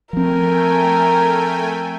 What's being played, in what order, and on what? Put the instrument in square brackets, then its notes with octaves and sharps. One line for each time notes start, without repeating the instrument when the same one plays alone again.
[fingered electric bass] F3 C4 [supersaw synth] A3 G5 G#5 [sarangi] A#4